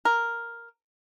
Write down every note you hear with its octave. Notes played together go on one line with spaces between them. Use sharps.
A#4